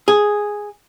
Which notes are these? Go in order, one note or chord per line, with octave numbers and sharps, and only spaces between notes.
G#4